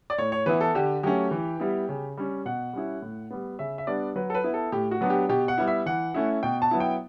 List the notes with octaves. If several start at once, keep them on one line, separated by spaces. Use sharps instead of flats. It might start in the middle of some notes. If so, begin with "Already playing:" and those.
D5
A2 C#5
C#5
E3 B3 E4 B4
A4
D3 G4
F#3 A3 C#4 G4
E3
G3 B3 E4
C#3
G3 C#4
B2 F#5
G3 C#4 E4
A2
G3 B3
C#3 E5
E5
G3 B3 D4 D5
F#3 B4
A4
B4
B3 E4
A4
A2 G4
F#4
F#3 B3 D4
G4
B2 G4
F#5
G3 B3 E4
E5
E3 F#5
A3 C#4 E4
B2 G5
A5
F#3 B3 E4
G5